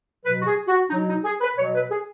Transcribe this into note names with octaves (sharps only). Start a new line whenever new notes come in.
B2 F#3 B4
F#4
G#4
F#4
B2 F#3 D#4
D#4
G#4
B4
B2 F#3 C#5
B4
G#4